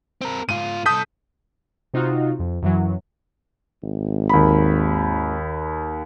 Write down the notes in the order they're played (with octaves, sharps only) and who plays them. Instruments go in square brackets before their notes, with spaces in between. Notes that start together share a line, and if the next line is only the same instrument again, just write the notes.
[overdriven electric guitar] C4 A#4
[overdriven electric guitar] G#2 F4 [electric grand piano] D#7
[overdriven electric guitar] C2 A4 [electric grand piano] D#6 G6 B6
[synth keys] C3 D#4 F4 F#4
F2
F#2 E3 F#3
[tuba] G#1
[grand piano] D#2 B5